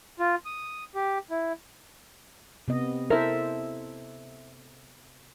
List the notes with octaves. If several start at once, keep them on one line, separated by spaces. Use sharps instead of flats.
F4
D#6
G4
E4
C3 B3 D#5
E4 A4 A#4 C5 E5